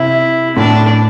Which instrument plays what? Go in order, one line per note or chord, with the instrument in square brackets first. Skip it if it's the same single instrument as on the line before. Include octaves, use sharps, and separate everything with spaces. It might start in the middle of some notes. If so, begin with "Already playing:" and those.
Already playing: [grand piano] C3 [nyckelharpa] E4
[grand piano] A2 [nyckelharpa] D4